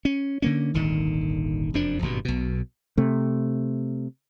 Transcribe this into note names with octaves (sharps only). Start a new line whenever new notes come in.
C#4
D3 A#3 C#4
D#1 G#1 D3 D#3
F1 F#2 F3 D4
G#1 G2 B2
B1 B2
C3 A3